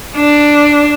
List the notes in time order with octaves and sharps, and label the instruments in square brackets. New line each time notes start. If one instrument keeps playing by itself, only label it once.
[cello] D4